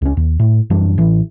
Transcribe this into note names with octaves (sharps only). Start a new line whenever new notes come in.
C#2 C#4
D#2
A2
F#2 E3 G3 D4
A1 E3